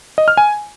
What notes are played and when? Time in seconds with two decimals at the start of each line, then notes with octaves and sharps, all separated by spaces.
0.18 D#5
0.28 F6
0.37 G#5